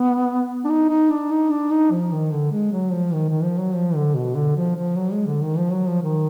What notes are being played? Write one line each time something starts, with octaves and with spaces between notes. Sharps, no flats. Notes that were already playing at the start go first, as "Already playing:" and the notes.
Already playing: B3
D4
D#4
D#4
D4
D#4
D4
D#4
F3
D#3
D3
G#3
F#3
F3
D#3
D#3
F3
F#3
F3
D3
B2
D3
F3
F3
F#3
G#3
D3
D#3
F3
F#3
F3
D#3